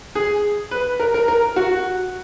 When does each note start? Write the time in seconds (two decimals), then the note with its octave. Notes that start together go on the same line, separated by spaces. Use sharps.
0.15 G#4
0.71 B4
1.00 A#4
1.14 A#4
1.28 A#4
1.56 F#4